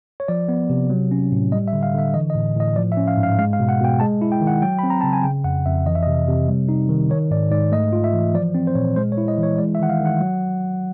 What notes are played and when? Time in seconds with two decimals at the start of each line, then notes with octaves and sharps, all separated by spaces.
0.20 C#5
0.28 F3 D5
0.49 B3
0.70 C3
0.90 F#3
1.11 C#4
1.32 A2
1.52 G3 D#5
1.68 E5
1.73 D3
1.83 F5
1.94 D3 E5
2.14 E3 D#5
2.30 D#5
2.35 A2
2.56 A2 D#5
2.76 F3 D5
2.92 E5
2.97 C#4
3.08 F5
3.17 G#2
3.23 F5
3.38 G#3 F5
3.53 F5
3.60 B2
3.69 F#5
3.80 B2 G5
4.00 G#3 A5
4.22 E4
4.32 G5
4.41 D#3
4.47 F#5
4.62 F#3 G5
4.79 C4 B5
4.90 A#5
5.01 C#3 A5
5.13 G#5
5.24 C#3 G5
5.44 F2 F#5
5.66 F2 E5
5.86 E3 D#5
5.95 E5
6.03 C3 D#5
6.28 C3
6.49 G3
6.69 D#4
6.89 D#3
7.10 D#3 C#5
7.31 G#2 D5
7.51 G#2 D5
7.72 A3 D#5
7.93 F4
8.04 E5
8.13 E3
8.34 F3 D5
8.55 C4
8.67 C5
8.75 A#2 C#5
8.96 G#3 C5
9.12 C#5
9.18 E4
9.28 D#5
9.38 E3
9.43 C#5
9.58 G#3 D5
9.75 E5
9.80 D#3 F#5
9.90 F5
10.00 D#3
10.06 F#5
10.21 F#3